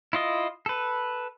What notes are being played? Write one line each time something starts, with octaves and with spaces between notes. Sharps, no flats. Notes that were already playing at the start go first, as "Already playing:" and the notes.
E4 F4 D#5
A4 B4